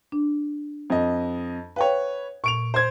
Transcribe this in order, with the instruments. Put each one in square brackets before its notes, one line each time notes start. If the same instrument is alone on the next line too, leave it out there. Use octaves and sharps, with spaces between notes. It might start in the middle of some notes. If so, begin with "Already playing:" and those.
[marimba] D4
[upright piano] F2 D#5
[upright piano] B4 C#5 [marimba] F5 G5
[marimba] A#2 [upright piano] C#6 D7 F7
[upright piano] C5 G#6